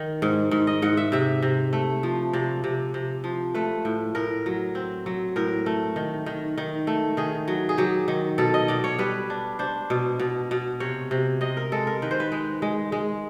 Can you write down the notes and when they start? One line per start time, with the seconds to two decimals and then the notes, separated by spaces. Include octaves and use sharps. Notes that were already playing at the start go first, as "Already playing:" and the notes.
Already playing: D#3
0.22 G#2
0.51 G#2
0.67 D#5
0.82 G#2 F#5
0.97 E5
1.12 C3 E5
1.42 C3
1.73 A3
2.03 F3
2.33 C3 D5
2.64 C3
2.94 C3
3.24 F3
3.54 A3 B4
3.85 A2
4.15 A2 A#4
4.46 F#3
4.75 C4
5.06 F#3
5.36 A2 A#4
5.66 A3
5.96 D#3
6.26 D#3
6.58 D#3
6.87 A3
7.17 D#3 G#4
7.48 F#3
7.69 G#4
7.77 F#3 G4
8.08 D#3
8.38 B2 A4
8.54 D#5
8.68 B2 D5
8.84 C#5
8.99 G3 B4
9.30 D4
9.59 D4 C5
9.90 B2
10.20 B2
10.51 B2
10.80 C3 C#5
11.11 C3
11.41 C3 D#5
11.57 A#4
11.72 G#3 A4
11.87 A#4
12.02 D#3 B4
12.11 C5
12.20 B4
12.32 G#3
12.62 G#3
12.92 G#3